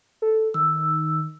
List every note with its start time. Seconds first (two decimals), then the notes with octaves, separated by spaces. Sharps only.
0.22 A4
0.54 D#3 E6